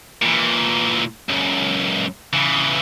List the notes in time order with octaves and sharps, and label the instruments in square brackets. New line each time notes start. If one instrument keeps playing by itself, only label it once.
[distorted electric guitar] A#2 E3
C#2 F#2
C#3 E3